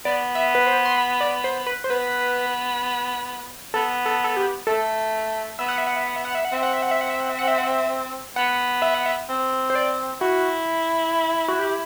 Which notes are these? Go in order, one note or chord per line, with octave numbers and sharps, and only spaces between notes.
B3 D5
E5
B4
C5
C6
B5
D5
C5
B4
C5
B3 B4
B3 A4
A4
A4
G4
A3 A4
B3 E5
F#5
E5
F#5
E5
F#5
E5
F#5
E5
F#5
C4 E5
F#5
E5
F#5
E5
F#5
E5
F#5
E5
F#5
E5
F#5
E5
B3 F#5
E5
F#5
E5
C4
C5
D5
E4 F#4
F#4
G4